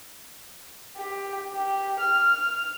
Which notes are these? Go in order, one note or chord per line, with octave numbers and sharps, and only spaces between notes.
G4
G4
F6